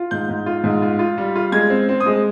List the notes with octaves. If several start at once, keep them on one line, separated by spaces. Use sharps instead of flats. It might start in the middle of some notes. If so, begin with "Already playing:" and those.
Already playing: F4
G#2 G6
G#2
F4
G#2
F4
F4
G3
F4
G#3 G#6
C4
C4
D#6
G#3